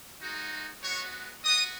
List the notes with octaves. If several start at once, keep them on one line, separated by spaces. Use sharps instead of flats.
G#3 D#4 F#4
G#3 B3 F#4 C#5 C#6
B3 F#4 D#5 D#6